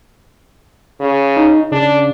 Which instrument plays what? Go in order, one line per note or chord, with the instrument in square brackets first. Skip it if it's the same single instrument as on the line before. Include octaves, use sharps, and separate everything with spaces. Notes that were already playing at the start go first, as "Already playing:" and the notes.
[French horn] C#3
[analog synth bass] D#4
[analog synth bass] C#3 [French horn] D4